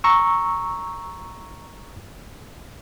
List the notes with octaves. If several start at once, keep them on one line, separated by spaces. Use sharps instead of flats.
A#5 C#6 E6